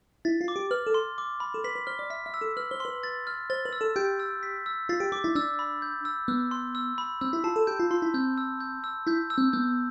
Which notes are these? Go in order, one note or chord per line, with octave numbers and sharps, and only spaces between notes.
E4 A6
F4
D6
G4
B4 F6
A4
C6
D6
B5
A4
B4 B6
B4
C5 F6
D5
E5 B6
E5
E6
A4
B4 F6
C5
B4 C6
A6
F6
C5 A6
B4
E6
A4
G4 G6
E6
B6
E6
F4 A6
G4
G4 D6
E4
D4 E6
B5
G6
E6
B3 E6
C6
E6
B5
C4 E6
E4
F4 A5
A4
G4 G6
F4
F4 C6
E4
C4 G6
E6
G6
E6
E4 G6
E6
C4
B3 G6